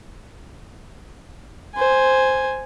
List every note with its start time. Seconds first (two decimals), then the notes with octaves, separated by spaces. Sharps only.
1.75 C5 G#5